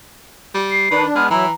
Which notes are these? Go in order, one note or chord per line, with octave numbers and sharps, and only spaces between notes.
G3
C7
D#3 D4 B4
G#3 B3 F6
E3 F#3 E4 A#5